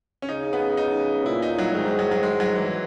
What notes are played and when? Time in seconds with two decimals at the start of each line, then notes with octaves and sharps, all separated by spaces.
0.22 C#4
0.29 C#3 D#4
0.53 B3
0.77 D#4
1.26 A#2 E4
1.42 D#4
1.59 F#3
1.75 G#2 D#3
1.87 D#3
1.99 F#3
2.11 F#3
2.23 G#3
2.40 F#3
2.56 E3